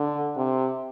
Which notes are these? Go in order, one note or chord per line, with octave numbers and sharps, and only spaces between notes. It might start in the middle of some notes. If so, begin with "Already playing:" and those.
Already playing: D3
C3